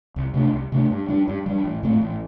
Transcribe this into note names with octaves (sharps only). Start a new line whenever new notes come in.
C2
C3 A3 D4
C2
C3 A3 D4
G2
G3 D4
G2
G3 D4
A1
A2 A3 C4
A1